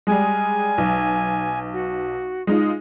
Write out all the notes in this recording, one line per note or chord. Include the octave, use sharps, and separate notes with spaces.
G3 G#3 G#5
B1
F#4
G#3 D#4 F4